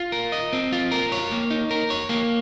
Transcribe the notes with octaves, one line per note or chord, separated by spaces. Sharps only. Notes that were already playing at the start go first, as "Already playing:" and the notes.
Already playing: F4
A#4
D#5
C4
F4
A#4
C#5
A#3
D#4
A#4
C#5
A#3